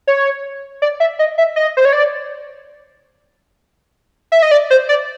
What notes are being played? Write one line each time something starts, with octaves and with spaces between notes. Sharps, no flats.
C#5
D5
E5
D#5
E5
D#5
C5
C#5
D5
E5
D#5
D5
C5
D5